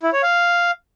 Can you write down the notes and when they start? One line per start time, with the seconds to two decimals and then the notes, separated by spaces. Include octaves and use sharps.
0.03 E4
0.13 C#5
0.23 F5